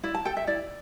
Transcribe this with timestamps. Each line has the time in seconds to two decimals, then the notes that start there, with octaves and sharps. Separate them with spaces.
0.03 E4 D5
0.14 A5
0.25 A4 G5
0.37 E5
0.47 E4 D5